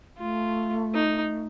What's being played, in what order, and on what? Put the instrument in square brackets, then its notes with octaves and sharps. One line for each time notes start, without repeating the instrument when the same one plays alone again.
[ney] A3 [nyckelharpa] F4
[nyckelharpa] D#4